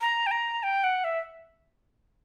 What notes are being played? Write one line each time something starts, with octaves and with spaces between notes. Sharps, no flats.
A#5
G5
A#5
G5
F#5
E5